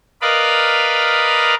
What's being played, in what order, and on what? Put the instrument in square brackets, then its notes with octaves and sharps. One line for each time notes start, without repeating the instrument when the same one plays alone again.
[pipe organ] A#4 B4 D5 D#5 F5 B5